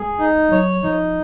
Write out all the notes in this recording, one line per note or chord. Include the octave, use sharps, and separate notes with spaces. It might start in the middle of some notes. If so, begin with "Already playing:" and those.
Already playing: G#3 G#4
D#4
F#3 C#5
F3 D#4